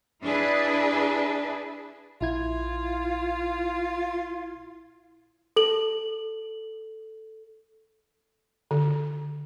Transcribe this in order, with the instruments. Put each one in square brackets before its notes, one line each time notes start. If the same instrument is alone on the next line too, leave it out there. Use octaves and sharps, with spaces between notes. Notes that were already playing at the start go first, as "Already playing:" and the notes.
[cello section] D4 E4 G#4 B4
[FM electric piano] A#1 E4 G#6 [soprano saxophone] F4
[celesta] A4 F#7
[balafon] D3